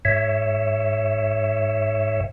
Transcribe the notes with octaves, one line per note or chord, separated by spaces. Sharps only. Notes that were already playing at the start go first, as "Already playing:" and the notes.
G#2 C#5 E5